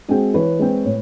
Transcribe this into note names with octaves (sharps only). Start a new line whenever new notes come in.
G#3 C4 F#4 G#4
E3 B4 C#5
G#3 C4
A2